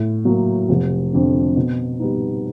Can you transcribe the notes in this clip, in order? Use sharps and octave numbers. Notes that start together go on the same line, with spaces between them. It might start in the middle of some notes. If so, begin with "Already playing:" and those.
Already playing: A2
F#3 A#3
F1
F2 D3
B2
G3 B3 D#4